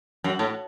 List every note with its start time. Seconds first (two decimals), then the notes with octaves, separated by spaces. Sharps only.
0.24 F#2
0.39 A2